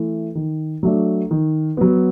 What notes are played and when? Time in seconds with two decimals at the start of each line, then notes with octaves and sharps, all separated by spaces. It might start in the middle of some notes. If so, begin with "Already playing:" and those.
Already playing: E3 A3
0.35 D#3
0.83 F#3 A3 D4
1.31 D#3
1.77 F#3 B3